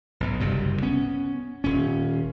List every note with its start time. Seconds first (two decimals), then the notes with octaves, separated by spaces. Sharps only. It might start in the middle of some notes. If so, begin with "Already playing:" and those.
0.20 B1 G#2
0.40 F#1 C2 G2 C3
0.82 B3 C#4
1.64 D#1 C#4